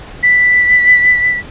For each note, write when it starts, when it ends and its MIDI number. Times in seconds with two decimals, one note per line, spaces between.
0.23 1.39 95